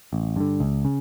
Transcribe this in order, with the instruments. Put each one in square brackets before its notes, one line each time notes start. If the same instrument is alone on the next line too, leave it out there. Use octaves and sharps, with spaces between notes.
[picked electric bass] A1
G2 D3
C#2
C#3